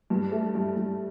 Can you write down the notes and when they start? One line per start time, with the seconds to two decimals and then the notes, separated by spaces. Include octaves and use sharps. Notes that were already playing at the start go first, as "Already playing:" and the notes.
0.10 G2
0.32 A3
0.55 G2
0.76 G2